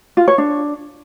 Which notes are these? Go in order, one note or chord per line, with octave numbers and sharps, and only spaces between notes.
F4
C#5
D4